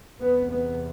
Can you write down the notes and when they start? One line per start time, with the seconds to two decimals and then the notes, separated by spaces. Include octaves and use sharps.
0.20 E2 C3 B3
0.51 B3